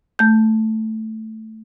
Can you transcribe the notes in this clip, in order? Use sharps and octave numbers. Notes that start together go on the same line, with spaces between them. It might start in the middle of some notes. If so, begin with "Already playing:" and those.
A3 G6